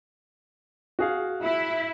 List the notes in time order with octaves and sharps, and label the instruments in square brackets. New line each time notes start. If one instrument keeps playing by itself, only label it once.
[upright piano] F#4 G#4 F5
[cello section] E4